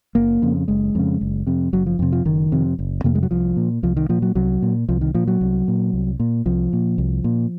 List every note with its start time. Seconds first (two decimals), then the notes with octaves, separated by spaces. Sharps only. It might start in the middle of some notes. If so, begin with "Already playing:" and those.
0.15 F#1 A#3
0.42 F2 C#3
0.68 F#1 G#3
0.95 F2 C#3
1.21 F#1
1.47 F2 C3
1.73 F#1 F#3
1.86 F3
1.99 F2 C3
2.12 F3
2.25 F#1 D#3
2.52 F2 C3
2.79 F#1
3.04 F2 C3 A#3
3.15 G#3
3.23 F#3
3.31 C2 F3
3.57 A#2
3.83 C2 F3
3.97 D#3
4.09 A#2 F3
4.22 F#3
4.35 C2 F#3
4.62 A#2
4.89 C2 F3
5.01 D#3
5.15 A#2 F3
5.27 F#3
5.41 C2
5.68 A#2
5.93 C2
6.20 A#2
6.46 C2 F3
6.73 A#2
6.98 C2
7.24 A#2